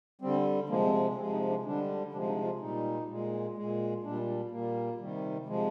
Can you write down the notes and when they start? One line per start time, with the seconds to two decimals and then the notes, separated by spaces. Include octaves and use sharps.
0.21 D3 G3 C4
0.69 C3 F3 G#3 A#3
0.85 C4
1.17 C3 F3 G#3 C4
1.33 D#4
1.49 D4
1.65 D3 G3 D4
2.13 C3 F3 G#3 D4
2.28 D#4
2.44 F4
2.61 A#2 G3 D#4
3.08 A#2 G#3
3.55 A#2 G#3
4.04 A#2 G3 D4
4.51 A#2 G3 A#3
4.99 C3 D#3 G3
5.46 C3 F3 G#3